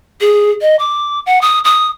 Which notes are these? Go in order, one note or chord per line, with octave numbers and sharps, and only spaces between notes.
G#4
D#5
D6
F#5
D#6
D#6